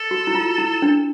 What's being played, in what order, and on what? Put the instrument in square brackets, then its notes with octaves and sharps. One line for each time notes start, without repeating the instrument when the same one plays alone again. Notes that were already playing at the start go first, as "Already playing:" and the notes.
Already playing: [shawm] A4
[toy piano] F#4
E4
F4
E4
D4